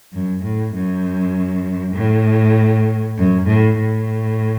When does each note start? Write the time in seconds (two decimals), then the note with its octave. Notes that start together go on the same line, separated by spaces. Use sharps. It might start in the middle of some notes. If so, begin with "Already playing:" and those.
0.13 F#2
0.44 A2
0.74 F#2
1.96 A2
3.18 F#2
3.48 A2
3.78 A2